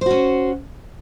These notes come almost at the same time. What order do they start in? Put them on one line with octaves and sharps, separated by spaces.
C5 F#4 C#4